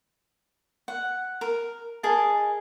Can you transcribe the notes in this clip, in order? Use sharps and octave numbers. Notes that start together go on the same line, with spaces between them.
F#5
A#4
G#4 A#4 D#5 A5